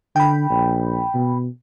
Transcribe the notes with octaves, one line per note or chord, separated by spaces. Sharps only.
D3 G5 B5
A#1
B2